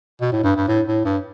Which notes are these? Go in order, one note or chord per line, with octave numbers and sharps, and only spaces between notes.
B2
A2
G2
G2
A2
A2
G2